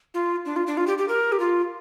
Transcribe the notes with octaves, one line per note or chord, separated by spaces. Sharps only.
F4
D4
F4
D4
F4
G4
G4
A#4
G4
F4